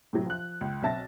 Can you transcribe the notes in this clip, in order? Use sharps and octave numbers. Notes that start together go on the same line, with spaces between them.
A2 C3 F#3
F3 F#6
C#2
B1 C4 E5 A5 A6 A#6